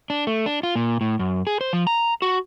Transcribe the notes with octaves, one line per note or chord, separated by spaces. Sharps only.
D4
A3
D4
F4
A#2
A2
F#2
G#4
C5
F3
A#5
F#4